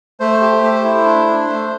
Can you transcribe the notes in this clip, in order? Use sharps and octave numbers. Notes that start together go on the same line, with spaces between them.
A3 C5
G4
A3
E4
D4
D4
A3